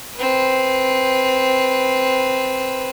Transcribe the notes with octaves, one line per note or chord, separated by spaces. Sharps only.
C4 B4